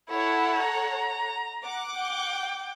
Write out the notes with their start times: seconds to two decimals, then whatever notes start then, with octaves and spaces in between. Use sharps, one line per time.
0.10 E4 A4 C#5 F#5
0.65 A#5
1.65 F#5 D6
1.98 G5